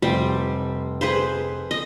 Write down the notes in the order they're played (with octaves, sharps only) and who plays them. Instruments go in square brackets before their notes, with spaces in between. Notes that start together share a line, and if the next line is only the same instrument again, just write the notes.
[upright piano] F1 [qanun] G3 C5
[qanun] G#4 B4 C5
D#5